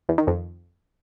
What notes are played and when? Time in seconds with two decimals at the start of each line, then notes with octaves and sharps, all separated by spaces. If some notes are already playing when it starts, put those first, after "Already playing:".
0.09 E2
0.18 D#3
0.27 F2